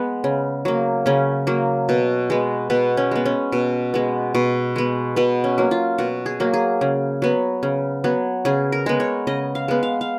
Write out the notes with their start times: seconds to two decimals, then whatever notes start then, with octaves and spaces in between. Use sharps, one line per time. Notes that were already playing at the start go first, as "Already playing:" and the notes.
Already playing: G#3 B3
0.24 C#3
0.65 F#3 A#3
1.06 C#3 C#4
1.47 F#3 A#3
1.89 B2
2.30 G#3 B3
2.70 B2 B3
2.97 C#4
3.11 G#3 B3
3.26 C#4
3.52 B2
3.94 G#3 B3
4.35 B2
4.76 G#3 B3
5.16 B2 B3
5.44 C#4
5.58 F#3 A#3
5.71 F4
5.98 B2 F#4
6.26 G#4
6.40 F#3 A#3
6.54 G#4
6.81 C#3
7.22 F#3 B3
7.63 C#3
8.04 F#3 B3
8.45 C#3 G#4
8.72 A#4
8.86 G#3 B3
9.00 C#5
9.27 C#3 D#5
9.55 F5
9.68 G#3 B3
9.83 F5
10.01 F5